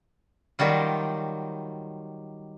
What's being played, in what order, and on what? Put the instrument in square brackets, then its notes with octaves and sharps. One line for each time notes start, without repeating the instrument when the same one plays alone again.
[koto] D#3 F#3 G3 F4